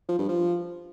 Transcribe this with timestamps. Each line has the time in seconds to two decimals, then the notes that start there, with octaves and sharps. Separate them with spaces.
0.09 F3
0.19 G2
0.29 F3